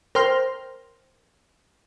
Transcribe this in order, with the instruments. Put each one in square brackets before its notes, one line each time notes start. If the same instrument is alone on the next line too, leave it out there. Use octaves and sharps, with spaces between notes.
[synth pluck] A#4 C5 G5 C6 F6